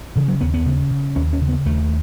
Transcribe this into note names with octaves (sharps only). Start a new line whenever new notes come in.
C#3 E3
F#3
D#2 B3
B3
C#3
C#3
D#2 C#4
C#4
C#3
B3
D#2 A3